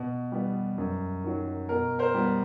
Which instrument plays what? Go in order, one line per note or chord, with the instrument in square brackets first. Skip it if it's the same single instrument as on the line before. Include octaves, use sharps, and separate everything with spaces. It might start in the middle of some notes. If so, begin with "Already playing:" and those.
Already playing: [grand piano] B2
G3 B3
F#2
D#3 F#3
B2 A#4
A#4 C5
G3 B3